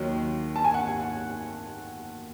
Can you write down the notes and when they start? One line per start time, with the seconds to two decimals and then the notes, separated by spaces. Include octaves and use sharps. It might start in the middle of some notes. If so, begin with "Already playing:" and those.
Already playing: D#2 D#3 F#3
0.56 A5
0.64 G#5
0.74 F#5